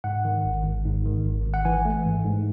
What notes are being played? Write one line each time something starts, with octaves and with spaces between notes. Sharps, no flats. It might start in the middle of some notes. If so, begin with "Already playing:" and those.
G#2 F#5
D#3
G#1
G#1
G#2
D#3
G#1
G#1
F#5
E3 G#5
A3
G#2
G#2